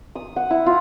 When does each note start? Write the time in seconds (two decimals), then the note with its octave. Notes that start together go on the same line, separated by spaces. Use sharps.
0.16 D#6
0.36 F#5
0.50 E4
0.66 F4